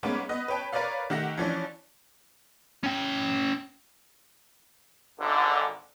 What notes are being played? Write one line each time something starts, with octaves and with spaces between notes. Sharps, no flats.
G3 G#3 A#3 B3 C#4 D#4
B3 D#5 D#6 F#6
B4 C#5 G5 A5
A#4 B4 C#5 D5 F5
D#3 A3 G4 F#5 A#6
E3 F3 C#4 D4
C#4 G5
G#1 D3